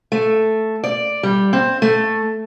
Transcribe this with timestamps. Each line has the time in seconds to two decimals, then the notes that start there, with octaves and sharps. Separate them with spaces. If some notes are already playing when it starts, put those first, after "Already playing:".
0.12 A3
0.84 D5
1.23 G3
1.53 C4
1.82 A3